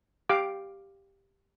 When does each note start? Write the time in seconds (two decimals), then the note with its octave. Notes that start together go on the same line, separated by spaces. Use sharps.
0.29 G4 F5 D6